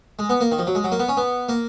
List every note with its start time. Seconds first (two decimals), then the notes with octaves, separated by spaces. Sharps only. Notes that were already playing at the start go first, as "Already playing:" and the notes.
0.19 G#3
0.29 B3
0.41 A#3
0.52 D#3
0.59 F3
0.67 F#3
0.75 G#3
0.84 F#3
0.92 A#3
0.99 B3
1.09 C#4
1.17 B3
1.49 A#3